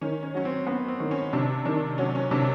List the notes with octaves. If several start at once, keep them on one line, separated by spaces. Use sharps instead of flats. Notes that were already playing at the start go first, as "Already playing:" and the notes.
D#3 C#4
C#4
F#3 C#4
C4
B3 C#4
C4
D#3
C#4
C3 D4
D#3 D4
F#3 C#4
C#4
C3 D4